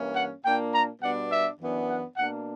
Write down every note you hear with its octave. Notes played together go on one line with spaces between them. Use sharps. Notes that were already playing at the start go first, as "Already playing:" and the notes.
Already playing: G2 E3 A#3 C#4
F#5
A#2 A#3 D4 G5
A#5
B2 G3 B3 D4 F#5
E5
F#2 E3 B3 D4
F#5
B2 A#3 D4 F#5